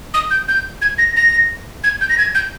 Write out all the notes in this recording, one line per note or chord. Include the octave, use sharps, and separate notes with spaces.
D#6
G6
G6
G#6
A#6
A#6
G#6
G6
A#6
G#6
G6